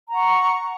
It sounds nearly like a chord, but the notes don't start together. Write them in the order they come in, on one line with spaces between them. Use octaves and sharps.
A#5 F#5 C#6